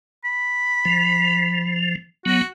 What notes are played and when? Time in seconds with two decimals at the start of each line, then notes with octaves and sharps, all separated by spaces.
0.25 B5
0.85 F3
2.26 F#3 B3 F#4